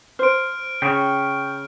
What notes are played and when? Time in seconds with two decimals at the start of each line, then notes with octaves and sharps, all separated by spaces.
0.19 C5 F6 D7
0.82 C#3 G5 C#6